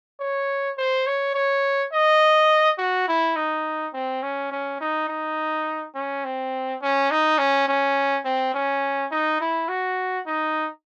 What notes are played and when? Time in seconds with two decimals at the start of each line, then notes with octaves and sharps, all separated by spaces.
0.20 C#5
0.78 C5
1.07 C#5
1.34 C#5
1.93 D#5
2.78 F#4
3.08 E4
3.36 D#4
3.94 C4
4.22 C#4
4.51 C#4
4.81 D#4
5.09 D#4
5.95 C#4
6.24 C4
6.82 C#4
7.11 D#4
7.38 C#4
7.68 C#4
8.25 C4
8.54 C#4
9.11 D#4
9.41 E4
9.69 F#4
10.27 D#4